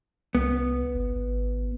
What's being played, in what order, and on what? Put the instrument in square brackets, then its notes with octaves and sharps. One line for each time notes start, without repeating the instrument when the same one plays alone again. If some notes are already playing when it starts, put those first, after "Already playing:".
[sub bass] C2 [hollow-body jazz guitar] B3
[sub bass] G1
G#1